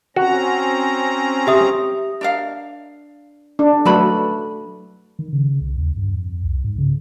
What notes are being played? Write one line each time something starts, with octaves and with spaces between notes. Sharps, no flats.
C4 C#4 F#4 A#5
G4 E5 D#6
D4 A#4 F5
D4
F#3 A3 F#4 A4 B4 B5
D#3
C#3
C2
D#2
G2
F2
C2
G#2
C#3